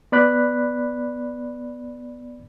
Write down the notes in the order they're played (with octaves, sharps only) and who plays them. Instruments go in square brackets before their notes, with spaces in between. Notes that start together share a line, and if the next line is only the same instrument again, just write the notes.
[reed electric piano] B3 D5 B5 F#6